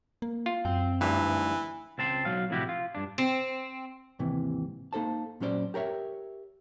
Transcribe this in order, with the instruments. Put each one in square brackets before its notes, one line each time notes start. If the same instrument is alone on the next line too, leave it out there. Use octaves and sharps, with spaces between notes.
[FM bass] A#3
[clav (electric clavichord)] F4
[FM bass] F#2 [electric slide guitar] C4 G5
[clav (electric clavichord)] D2 G2 [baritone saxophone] E3 [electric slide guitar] F3 A3 D#4
[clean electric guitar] C#2 C4 A5 C6
B1 F#3 F5
A2 C3 F3 E4 F#4 G4
F4
G2 D4
[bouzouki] C4
[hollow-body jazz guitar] D#2 G#2 C3 E3
A#3 D#4 A4 C5 A5
A#2 F#3 C#4 C5 D5
G4 A#4 C#5 E5